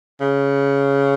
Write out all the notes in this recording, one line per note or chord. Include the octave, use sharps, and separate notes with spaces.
C#3